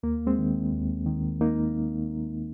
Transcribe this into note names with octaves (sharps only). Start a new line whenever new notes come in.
D#2 A#3
G#3 C4
D#3
D#2
D#3
A#3 D#4